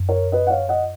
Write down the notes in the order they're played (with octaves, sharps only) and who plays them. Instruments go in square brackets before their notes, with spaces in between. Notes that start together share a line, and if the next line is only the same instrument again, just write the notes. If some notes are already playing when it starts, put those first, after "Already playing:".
Already playing: [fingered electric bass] F#2
[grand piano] A#4 C#5
B4 D#5
F#5
C#5 F5
D#5 F#5